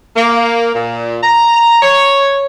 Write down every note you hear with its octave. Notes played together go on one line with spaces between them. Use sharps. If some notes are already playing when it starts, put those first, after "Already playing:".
A#3
A#2
A#5
C#5